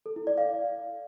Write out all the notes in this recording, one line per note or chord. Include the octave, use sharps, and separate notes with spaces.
A4
E4
D5
F5